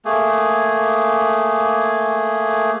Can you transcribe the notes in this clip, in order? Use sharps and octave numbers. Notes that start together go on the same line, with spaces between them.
A3 A#3 G#4